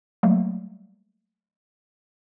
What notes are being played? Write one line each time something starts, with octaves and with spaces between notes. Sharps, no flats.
F#3 G3 A3 A#3